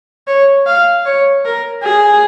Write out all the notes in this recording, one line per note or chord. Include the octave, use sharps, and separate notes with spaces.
C#5
F5
C#5
A#4
G#4